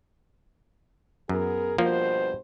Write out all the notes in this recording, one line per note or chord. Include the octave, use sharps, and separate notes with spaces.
F#2 B3 G#4 A#4
G2 B2 F3 A#3 C5